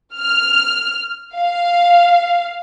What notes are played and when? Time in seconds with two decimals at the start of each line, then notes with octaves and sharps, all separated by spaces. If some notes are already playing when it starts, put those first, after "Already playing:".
0.17 F6
1.35 F5